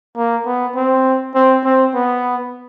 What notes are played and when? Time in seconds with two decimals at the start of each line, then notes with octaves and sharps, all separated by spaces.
0.16 A#3
0.46 B3
0.76 C4
1.35 C4
1.65 C4
1.95 B3